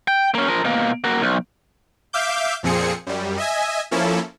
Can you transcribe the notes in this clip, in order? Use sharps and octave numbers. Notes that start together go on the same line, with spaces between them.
G5
A#3 C#4
F3 A#4
B2 A#3
A#3 F#4
B1
E5 F5 D6 G6
F2 A#2 F3 C4 G#4 C#7
F#2 G3
D#5 E5 G#5
F3 A#3 C#4 E4 A4